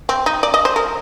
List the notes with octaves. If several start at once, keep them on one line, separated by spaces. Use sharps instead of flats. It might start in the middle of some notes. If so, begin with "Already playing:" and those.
C4
D#4
D5
D#5
C5
A#4